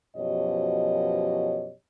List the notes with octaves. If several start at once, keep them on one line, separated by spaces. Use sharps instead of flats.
F#2 B2 F3 G4 C#5 D#5